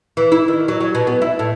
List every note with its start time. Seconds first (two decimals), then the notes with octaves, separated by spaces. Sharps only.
0.17 E3
0.32 E4
0.48 D#3
0.68 F#3
0.80 F#3
0.95 B2
1.07 B3
1.22 E4
1.39 A2